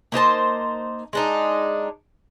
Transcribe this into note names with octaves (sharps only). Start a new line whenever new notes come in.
A#3 D#4 C5 A5
G#3 D4 D#4